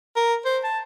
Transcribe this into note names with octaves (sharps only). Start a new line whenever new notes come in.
A#4
C5
A5